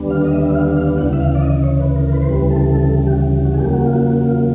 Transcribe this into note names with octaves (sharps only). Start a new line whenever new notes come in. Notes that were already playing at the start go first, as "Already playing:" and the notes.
Already playing: D#2 D3 G3 B3 D4
F5
D#5
E5
E5
F5
F5
D2 C#3 E3 F#5
E5
F5
D5
D#5
C#5
B4
A#4
A#4
B4
C5
D2 C#3 E3 G3 B4
A4
A4
G4
F#4
F#4
G#4
E2 C#3 F#3 A#3 G4
F#4
G4
F4
F#4
F#4
F4